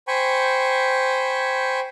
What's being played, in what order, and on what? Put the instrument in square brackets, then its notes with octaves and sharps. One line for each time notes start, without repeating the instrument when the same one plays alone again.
[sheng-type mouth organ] C5 G5 G#5 B5 C#6